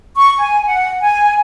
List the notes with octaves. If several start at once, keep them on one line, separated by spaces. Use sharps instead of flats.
C#6
G#5
F#5
G#5